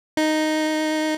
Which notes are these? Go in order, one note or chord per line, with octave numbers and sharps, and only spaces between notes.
D#4